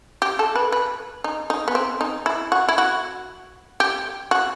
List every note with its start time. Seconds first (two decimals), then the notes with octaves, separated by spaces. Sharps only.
0.22 G4
0.39 A4
0.56 B4
0.72 B4
1.24 D#4
1.50 D#4
1.68 B3
1.75 C4
2.01 D#4
2.26 E4
2.52 F#4
2.68 E4
2.78 F#4
3.80 G4
4.31 F#4